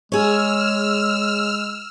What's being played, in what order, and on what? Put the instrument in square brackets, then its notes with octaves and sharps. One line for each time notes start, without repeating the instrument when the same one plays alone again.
[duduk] G#3 [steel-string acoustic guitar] G#4 C#5 [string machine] E6 F6